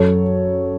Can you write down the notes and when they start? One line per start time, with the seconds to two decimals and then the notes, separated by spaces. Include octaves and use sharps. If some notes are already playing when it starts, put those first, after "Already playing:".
Already playing: F#2 A4 C#5